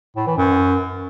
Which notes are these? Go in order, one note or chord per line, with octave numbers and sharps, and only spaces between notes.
A2
E3
F#2